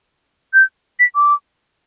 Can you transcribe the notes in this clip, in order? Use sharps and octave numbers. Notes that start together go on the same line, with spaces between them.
G6
B6
D6